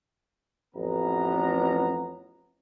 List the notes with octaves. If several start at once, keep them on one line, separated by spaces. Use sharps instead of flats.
A1 F2 B3 A#5